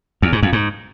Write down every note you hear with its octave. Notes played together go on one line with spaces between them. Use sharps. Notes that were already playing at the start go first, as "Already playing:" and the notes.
E2
G#2
F2
G#2